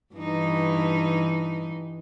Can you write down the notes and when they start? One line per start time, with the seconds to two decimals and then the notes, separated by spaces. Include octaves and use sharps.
0.14 G2 E3 D#4